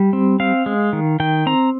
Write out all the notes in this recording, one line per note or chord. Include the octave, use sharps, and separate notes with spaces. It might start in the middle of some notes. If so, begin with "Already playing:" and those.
Already playing: G3
C4
C4 F5
G#3
D#3
D#3 G5
C4 A#5